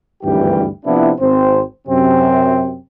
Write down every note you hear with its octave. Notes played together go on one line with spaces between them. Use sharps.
G#1 D2 G2 E3 G3 G4
C3 F3 B3 D4 E4
G#1 C4 C5
F#2 C3 C4